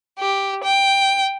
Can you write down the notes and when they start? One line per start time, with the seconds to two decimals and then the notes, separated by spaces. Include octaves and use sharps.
0.19 G4
0.63 G5